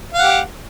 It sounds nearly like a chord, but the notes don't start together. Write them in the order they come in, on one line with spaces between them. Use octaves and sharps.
F5 F#5 G4